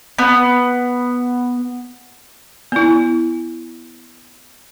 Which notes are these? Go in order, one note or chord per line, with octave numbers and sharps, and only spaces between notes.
B3
B3 E4